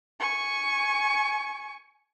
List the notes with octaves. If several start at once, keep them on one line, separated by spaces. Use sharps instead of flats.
G#5 C#6